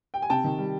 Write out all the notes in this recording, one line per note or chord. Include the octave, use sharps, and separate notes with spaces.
G5
G#5
C3 G5 A5
D#3
G3